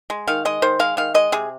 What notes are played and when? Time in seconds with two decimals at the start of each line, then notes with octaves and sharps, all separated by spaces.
0.10 G#3
0.27 D#3 F5
0.45 G#3 D#5
0.62 D#3 C5
0.79 G#3 F5
0.97 D#3 F5
1.14 G#3 D#5
1.32 C3 G#4